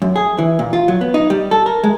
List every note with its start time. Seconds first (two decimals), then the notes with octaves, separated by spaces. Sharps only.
0.02 F#2
0.16 G#4
0.38 E3
0.59 A#2
0.73 F4
0.88 F#3
1.01 B3
1.14 D#4
1.30 G3
1.51 A4
1.66 A#4
1.84 G#3